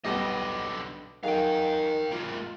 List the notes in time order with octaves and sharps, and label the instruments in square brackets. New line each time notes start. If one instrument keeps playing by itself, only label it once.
[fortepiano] B1 G3 B3 [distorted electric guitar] D3 D#5
[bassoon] D#3 [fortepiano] F#3 G#4 [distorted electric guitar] F5 G5
[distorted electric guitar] G#3 A#3 [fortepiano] F4